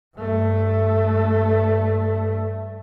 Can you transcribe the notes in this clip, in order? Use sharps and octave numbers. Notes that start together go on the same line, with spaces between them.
G2 A3